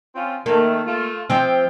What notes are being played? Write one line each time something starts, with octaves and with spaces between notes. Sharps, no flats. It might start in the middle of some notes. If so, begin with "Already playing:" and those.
C4 C#4 F4
D#3 A3 A#3
A3 F4
F3 C4 F4 E5 G5